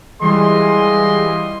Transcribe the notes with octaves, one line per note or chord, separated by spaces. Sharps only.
E3 G3 G#3 F4 D#5 C6